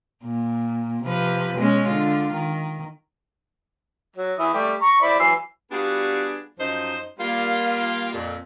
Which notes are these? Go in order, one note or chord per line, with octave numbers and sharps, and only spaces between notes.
A#2
C3 F3 B4
B2 G#3 C#4
D3 F4
D#3
F#3
E3 E4 D#6
G3 A3 G4
A#5 C#6
E4 C5 D5 B5
E3 F#3 E6 C7
G3 B3 D4 F4 F#4 G#4
F#2 F3 D#4 C5
G3 A#3 F4
F2 A#2